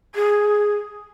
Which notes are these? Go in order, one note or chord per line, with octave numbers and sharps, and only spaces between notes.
G#4